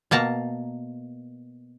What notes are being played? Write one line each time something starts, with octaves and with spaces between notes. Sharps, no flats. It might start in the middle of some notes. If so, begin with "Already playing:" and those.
B2 A#3 A5 A#5